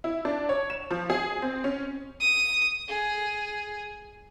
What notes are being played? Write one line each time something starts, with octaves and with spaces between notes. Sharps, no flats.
E4
D4
C#5
E7
F3
G#4
C4
C#4
D#6
G#4